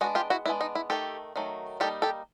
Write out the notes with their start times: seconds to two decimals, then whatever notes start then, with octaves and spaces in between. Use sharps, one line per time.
0.01 G#3 B3 D4 F#4 G#4
0.15 F4 G4
0.30 E4 F#4
0.46 G#3 B3 D4 E4
0.61 D#4
0.75 E4
0.90 D#3 F#3 A3 G4 A4
1.36 D#3 F#3 A3
1.80 G3 A#3 D#4 G4 A4
2.02 G4 A4